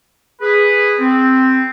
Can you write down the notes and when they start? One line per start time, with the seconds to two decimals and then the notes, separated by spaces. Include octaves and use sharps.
0.41 G#4 B4
1.00 C4